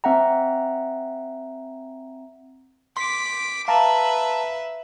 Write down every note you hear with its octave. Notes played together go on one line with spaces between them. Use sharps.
C4 E5 F#5 G5 A#5
C6 D6 B6
B4 E5 F5 A5 A#5